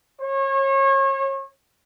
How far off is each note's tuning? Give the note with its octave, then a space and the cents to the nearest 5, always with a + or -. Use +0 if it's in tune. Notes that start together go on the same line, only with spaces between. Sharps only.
C#5 -35